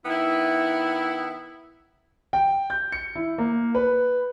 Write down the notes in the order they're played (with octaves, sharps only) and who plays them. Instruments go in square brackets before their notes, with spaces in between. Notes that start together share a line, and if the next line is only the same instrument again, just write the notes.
[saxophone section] D#3 B3 E4
[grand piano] G5
G6
C#7
E4
A#3
B4